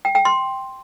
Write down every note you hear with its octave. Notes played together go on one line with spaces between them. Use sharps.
G5
G5
C6